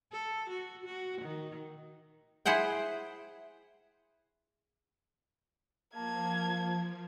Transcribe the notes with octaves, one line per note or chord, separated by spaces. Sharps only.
A4
F#4
F#4
D#3
E4 G#4 C5 F#5 G5
F3 A#3 A5 G#6